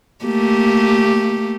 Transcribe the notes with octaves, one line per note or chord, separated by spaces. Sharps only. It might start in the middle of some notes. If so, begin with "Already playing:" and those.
A3 A#3 G4